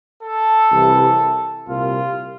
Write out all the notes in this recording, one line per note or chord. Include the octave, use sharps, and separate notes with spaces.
A4
C2 C3 E3 G3
C2 A#2 G3 F4